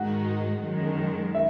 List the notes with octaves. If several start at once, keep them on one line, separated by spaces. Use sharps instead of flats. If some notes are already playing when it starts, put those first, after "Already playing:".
Already playing: G#2 D#3 G#3 D#4 F#4 F#5
F#2 D#3 G#3
E5